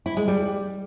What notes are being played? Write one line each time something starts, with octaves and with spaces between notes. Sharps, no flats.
E4
G#3
G3